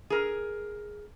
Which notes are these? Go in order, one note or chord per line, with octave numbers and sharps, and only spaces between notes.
G#4 A#4